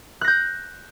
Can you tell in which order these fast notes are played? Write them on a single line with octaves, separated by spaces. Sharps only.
F#6 A#6 G6